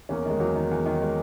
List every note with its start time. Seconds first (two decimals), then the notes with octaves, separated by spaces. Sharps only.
0.09 E2 A#3 C#4
0.26 D#3 G#3
0.40 E2 F#3 A#3
0.55 D#3
0.71 E2
0.86 D#3
1.02 G#3